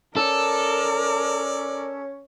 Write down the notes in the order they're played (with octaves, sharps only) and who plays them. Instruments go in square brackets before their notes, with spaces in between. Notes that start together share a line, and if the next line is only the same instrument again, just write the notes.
[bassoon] C#4 [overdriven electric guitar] A4 [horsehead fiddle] A#4 [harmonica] D5